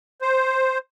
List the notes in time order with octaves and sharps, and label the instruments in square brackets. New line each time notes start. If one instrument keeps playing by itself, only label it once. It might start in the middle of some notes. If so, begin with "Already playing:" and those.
[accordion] C5